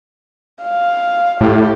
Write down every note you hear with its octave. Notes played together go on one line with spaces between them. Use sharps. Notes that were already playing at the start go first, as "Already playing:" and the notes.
F5
A2 G4